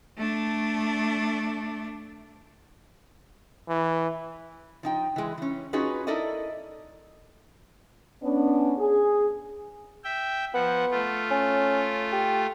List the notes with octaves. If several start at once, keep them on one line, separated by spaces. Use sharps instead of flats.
A3 D4
E3
F3 D#4 G5
E3 G#3
E3 C#4
C#4 D#4 F4 F#4 G#4 B4
D#4 E4 A4 A#4 D5 D#5
B3 C#4 D4
G#4
E5 G5
F3 B3 F#5
A3 F4
C#4
G4